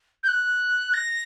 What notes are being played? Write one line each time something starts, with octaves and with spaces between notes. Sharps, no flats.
G6
F#6
A#6